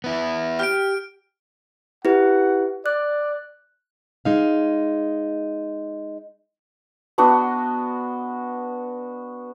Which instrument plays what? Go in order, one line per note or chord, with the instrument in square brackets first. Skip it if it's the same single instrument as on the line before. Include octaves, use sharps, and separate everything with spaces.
[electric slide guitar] B3 E4
[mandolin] G4 [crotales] F6 D7
[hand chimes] E4 G4 B4 [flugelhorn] F#5
[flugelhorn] D5 [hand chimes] F#6
[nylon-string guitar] G#3 D#4 F5
[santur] B3 D4 F#4 D#5